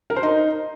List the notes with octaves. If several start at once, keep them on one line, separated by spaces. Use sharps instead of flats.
A#4
C5
D#4